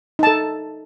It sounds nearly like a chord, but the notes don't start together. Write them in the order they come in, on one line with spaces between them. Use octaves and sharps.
D#4 A5 A4